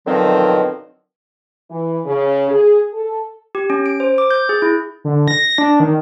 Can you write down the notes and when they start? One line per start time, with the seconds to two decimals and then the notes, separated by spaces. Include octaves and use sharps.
0.06 B2 D3 D#3 F3 F#3 C4
1.70 E3
2.06 C#3
2.51 G#4
2.93 A4
3.55 G4
3.70 C#4
3.86 D7
4.00 C5
4.18 D6
4.31 G6
4.49 G#4
4.62 E4
5.04 D3
5.28 A#6
5.58 D4
5.80 D#3